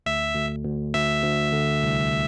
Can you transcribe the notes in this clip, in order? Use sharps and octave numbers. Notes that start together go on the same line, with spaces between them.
D2 E5
D2
D2
D2 E5
D2
D3
C2